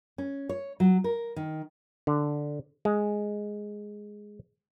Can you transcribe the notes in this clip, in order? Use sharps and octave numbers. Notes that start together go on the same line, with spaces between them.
C#4
C#5
F#3
A#4
D#3
D3
G#3